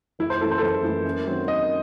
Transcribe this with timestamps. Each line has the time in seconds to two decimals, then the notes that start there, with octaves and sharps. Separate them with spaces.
0.19 F#1 E4
0.30 C5
0.41 F#2 E3 A3 A4
0.51 C5
0.58 A4
0.62 F#1 C5
0.83 F#2 E3 A3
1.05 F#2
1.27 D#3 F#3 C4
1.48 F#2 D#5